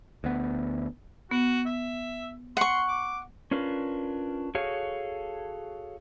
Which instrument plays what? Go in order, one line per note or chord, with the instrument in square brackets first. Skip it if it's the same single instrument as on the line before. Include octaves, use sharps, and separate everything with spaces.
[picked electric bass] D2 B3
[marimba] B3 [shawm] F#4
[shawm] E5
[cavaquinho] F#5 C#6 [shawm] C6
[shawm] D6
[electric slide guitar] C#4 D4 F4 A#4 B4
F#4 G#4 A4 C#5 F5